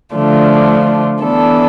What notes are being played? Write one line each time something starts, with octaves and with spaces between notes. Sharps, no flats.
D3 F3 A3 D4 F4
E3 B3 D4 A4